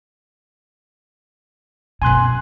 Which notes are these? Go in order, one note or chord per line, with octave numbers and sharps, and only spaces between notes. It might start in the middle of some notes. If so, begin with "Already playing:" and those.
F#2 B2 G#5 C6 F#6